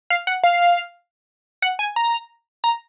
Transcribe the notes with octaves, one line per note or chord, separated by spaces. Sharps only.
F5
F#5
F5
F#5
G#5
A#5
A#5